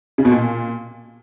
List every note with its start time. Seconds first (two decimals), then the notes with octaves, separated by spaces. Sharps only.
0.18 C#3
0.25 B2
0.32 A#2